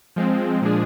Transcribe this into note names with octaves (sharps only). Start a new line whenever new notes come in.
F3 G#3 C4
A#2 F3 G#3 D4 G#4